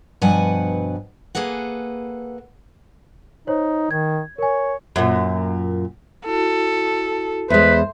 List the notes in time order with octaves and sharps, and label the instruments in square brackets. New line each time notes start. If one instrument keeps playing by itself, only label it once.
[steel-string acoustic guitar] G2 B2 F3 B4 F#5 G#5
A#3 G#4 A4 B4 F#5
[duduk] D#4 [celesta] C5 C#5
[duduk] D#3 [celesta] G#6
[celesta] A#4 G#5 [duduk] C#5
[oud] F#2 A#2
[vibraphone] E4 F#4 [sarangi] A4
[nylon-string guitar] E2 G#3 [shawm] B4 [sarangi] C5 [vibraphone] E5